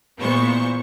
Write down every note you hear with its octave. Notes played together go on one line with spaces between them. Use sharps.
A#2 E3 G#3 B3 C5 C#6